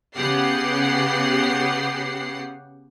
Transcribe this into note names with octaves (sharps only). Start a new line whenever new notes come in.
C#3 B3 G4 F#5 C7